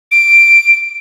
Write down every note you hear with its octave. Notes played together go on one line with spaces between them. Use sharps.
D7